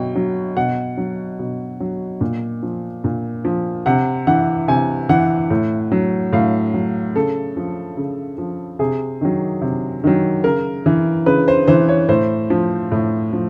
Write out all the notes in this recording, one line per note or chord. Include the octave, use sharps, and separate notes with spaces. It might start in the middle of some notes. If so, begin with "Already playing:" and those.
Already playing: B2 F#3 G5
F#3
B2 F#5
F#3
B2
F#3
A#2
F3
A#2
F3
C3 F#5
E3 F#5
C3 G#5
E3 F#5
A2
F#3
A2 F5
F#3
C#3 A4
F3
C#3
F3
C3 G#4
D#3 F#3
C3
D#3 F#3
C#3 A#4
E3
C#3 B4
C5
E3 C5
C#5
A2 C5
F3
A2
F3